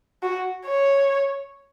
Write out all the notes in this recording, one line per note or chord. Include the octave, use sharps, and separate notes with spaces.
F#4
C#5